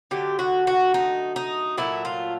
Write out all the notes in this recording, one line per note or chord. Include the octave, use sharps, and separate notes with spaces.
D3 F#3 A3 G4
F#4
F#4
D#4
D#4
A#2 F#3 A3 E4
F4